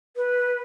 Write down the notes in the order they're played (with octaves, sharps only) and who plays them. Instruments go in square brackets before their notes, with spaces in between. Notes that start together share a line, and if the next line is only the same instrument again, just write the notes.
[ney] B4